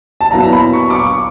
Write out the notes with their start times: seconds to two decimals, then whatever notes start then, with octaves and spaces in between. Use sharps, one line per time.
0.21 A5
0.31 A#2 F#3 B3 E4 A#5
0.43 A#5
0.53 B5
0.73 C#6
0.90 D6
0.95 C#6